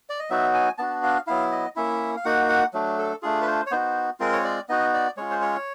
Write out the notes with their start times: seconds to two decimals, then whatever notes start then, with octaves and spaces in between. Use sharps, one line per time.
0.09 D5
0.19 D#5
0.30 F#3 B3 D#4 F#4 E5
0.54 G#5
0.78 B3 D4 F#4 A5
1.03 F5
1.27 F#3 B3 E4 F5
1.52 D#5
1.76 A#3 C#4 E4 E5
2.17 F5
2.25 A#3 D#4 F#4 F#5
2.49 F#5
2.73 F#3 A3 D4
2.99 A4
3.22 A3 D4 F4 G#4
3.42 B4
3.47 C5
3.67 C#5
3.71 B3 D#4 F#4 C5
4.20 G#3 C4 F4 A#4
4.32 C#5
4.44 D5
4.69 B3 D#4 F#4 D#5
4.94 D5
5.17 G#3 C#4 F4 C#5
5.31 C5
5.42 C#5